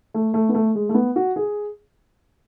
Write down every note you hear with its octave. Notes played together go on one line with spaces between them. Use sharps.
A3
A3
B3
A3
G#3
A3
B3
F#4
G#4